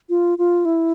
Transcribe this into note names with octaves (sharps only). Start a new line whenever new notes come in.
F4
F4
E4